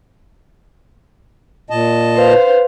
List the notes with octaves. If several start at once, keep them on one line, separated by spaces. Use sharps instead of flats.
A#2 D#5 A5
B4 C5 F5